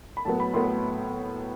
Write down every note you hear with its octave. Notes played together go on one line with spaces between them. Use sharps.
B5
A2 F#3 B3 A5
B5
A2 F#3 B3 C6